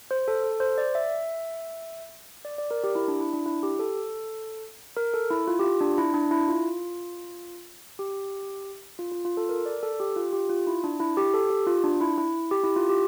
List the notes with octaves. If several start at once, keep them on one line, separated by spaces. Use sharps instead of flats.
C5
A4
A4
C5
D5
E5
D5
D5
A#4
G4
E4
D4
E4
D4
E4
G4
A4
A#4
A4
E4
F4
G4
F4
D4
E4
D4
E4
F4
G4
F4
F4
F4
A4
A#4
D5
A4
G4
F4
G4
F4
E4
D4
E4
G4
A4
G4
F4
D4
E4
E4
G4
E4
F4
G4